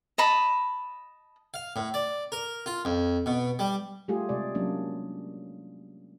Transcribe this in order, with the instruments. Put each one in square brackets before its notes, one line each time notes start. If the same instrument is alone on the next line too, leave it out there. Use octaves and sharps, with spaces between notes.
[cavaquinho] D#5 A5 B5
[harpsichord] F5
A2
D5
A#4
F4
F2
B2
G3
[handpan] G3 A3 F4 G4 G#4
C3 G#3 D5
F#3 A#3 C#4 D4